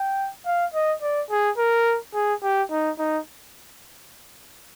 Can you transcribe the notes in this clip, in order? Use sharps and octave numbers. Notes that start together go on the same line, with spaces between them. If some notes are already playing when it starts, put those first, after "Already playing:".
Already playing: G5
F5
D#5
D5
G#4
A#4
G#4
G4
D#4
D#4